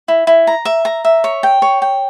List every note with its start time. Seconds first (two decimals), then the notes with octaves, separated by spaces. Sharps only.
0.08 E4
0.27 E4
0.47 A#5
0.65 E5
0.85 A#5
1.05 E5
1.24 C#5
1.43 G5
1.62 C#5
1.82 G5